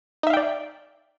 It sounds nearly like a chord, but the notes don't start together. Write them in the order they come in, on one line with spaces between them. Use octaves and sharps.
D#4 E5 F5 G5 D5